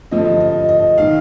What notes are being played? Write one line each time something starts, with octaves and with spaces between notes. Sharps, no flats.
G2 D3 F3 D#5
D#5
D#5
D#3 F5